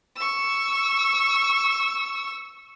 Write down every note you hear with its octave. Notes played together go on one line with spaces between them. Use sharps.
C#6 E6